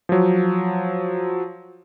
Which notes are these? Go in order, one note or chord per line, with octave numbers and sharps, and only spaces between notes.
F3 F#3